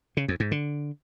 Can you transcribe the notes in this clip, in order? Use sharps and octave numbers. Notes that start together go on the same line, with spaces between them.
C#3
F2
G#2
D3